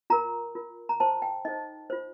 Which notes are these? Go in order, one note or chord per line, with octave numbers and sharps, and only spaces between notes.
F4 A#4 A#5
F4 A#4
A#5
F4 C5 A5
G5
D#4 A4 C5 D#5
F4 C5